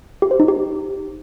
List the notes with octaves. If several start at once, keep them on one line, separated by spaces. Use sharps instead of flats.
G4
C5
D#4
G4